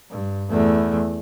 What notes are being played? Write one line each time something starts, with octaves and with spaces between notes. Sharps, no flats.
G2
E2 A3